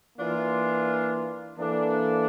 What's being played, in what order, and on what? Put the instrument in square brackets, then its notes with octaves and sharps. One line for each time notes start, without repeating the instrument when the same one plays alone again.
[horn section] E3 A#3 D4 F4
E3 A#3 D4 A4